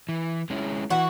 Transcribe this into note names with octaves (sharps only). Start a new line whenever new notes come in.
E3
G#3 C#4 E4
E3 F#4